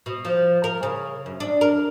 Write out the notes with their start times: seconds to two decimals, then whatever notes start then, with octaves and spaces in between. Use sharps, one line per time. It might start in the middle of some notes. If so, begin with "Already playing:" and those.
0.06 B2
0.25 F3
0.64 A#4
0.83 C#3
1.26 F#2
1.40 D4
1.61 A#4